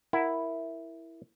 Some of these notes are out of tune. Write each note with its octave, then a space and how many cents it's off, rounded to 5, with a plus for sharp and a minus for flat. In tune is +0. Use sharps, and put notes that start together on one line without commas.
E4 +0 A#4 +0 F#5 +0